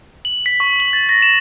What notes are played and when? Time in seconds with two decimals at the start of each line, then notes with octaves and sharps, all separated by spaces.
0.25 F#7
0.46 B6
0.60 C#6
0.80 F#7
0.93 A6
1.09 A#6
1.22 E7